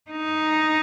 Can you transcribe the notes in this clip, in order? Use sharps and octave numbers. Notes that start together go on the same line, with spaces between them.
D#4